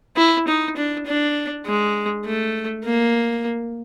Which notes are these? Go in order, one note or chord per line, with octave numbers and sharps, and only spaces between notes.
E4
D#4
D4
D4
G#3
A3
A#3